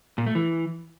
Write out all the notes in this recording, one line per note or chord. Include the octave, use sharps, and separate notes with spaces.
A#2
A3
E3